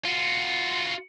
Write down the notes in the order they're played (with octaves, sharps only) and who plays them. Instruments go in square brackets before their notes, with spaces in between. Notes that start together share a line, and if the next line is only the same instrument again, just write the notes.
[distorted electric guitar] F4 F#4